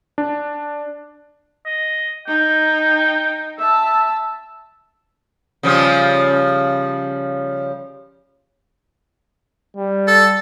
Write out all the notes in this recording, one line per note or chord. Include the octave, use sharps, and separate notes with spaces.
D4
D#5
D#4 G5
E5 A5 E6
C#3 F3 G3
G3
A4